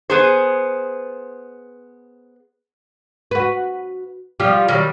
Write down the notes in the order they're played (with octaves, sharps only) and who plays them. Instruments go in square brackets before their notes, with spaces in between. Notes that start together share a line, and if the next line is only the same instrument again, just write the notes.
[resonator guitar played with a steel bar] B3 G#4 C5
[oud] F#4 B4
[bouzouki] F3 G3 F4 [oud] G4
[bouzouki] D#3 F#3 G3